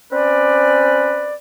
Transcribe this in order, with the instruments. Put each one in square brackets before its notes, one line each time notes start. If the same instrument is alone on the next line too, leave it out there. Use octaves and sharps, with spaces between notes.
[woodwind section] C4 C#4 B4 D5